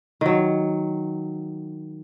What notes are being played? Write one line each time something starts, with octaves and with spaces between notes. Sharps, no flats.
D#3 F#3